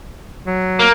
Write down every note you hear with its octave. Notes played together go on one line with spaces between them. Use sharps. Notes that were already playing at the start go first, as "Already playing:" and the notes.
F#3
A#3